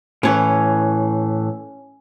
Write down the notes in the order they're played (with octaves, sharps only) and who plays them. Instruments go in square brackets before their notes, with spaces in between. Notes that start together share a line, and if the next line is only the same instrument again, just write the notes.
[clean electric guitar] A2 E3 [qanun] C#4 C#5